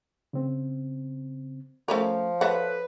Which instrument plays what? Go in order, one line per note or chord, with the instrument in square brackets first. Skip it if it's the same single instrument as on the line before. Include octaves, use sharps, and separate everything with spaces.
[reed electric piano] C#3 C4
[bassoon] F3 [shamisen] A3 C#4 A#4
[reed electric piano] A4 C#5 [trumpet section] B4 [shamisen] E5 F#5